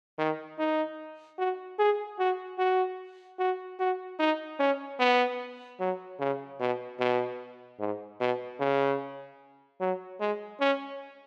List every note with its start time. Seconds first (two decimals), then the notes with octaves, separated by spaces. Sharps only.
0.19 D#3
0.59 D#4
1.39 F#4
1.79 G#4
2.19 F#4
2.59 F#4
3.39 F#4
3.80 F#4
4.20 D#4
4.60 C#4
5.00 B3
5.80 F#3
6.20 C#3
6.60 B2
7.00 B2
7.80 G#2
8.21 B2
8.60 C#3
9.80 F#3
10.20 G#3
10.61 C#4